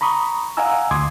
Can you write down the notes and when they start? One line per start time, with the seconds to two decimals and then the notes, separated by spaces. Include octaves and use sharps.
0.01 A#5 B5 C#6 D#6
0.57 D#5 F5 F#5 G#5 A#5 E6
0.91 D2 C6 D6 D#6 G#6